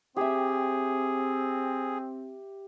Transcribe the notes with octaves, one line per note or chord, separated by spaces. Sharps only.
C4 G4 G#4 E5